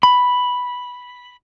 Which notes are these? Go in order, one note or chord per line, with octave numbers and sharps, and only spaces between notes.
B5